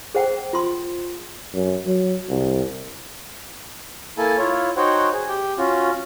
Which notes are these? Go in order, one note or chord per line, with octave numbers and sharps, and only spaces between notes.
G#4 C5 F#5 G5
F4 C6
F#2
F#3
C2
A#3 E4 A4 G#5 A5
E4 F4 C#5
D#4 F#4 C5 C#5 F#5 G5
G#4
G4 G5
C#4 F4 F#4